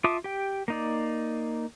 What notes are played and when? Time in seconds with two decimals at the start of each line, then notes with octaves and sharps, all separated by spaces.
0.04 F4 E5 A5 D6 D#6
0.24 G4 G5
0.68 A#3 D#4 D5